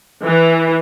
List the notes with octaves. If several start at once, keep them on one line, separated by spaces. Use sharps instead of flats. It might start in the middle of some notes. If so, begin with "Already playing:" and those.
E3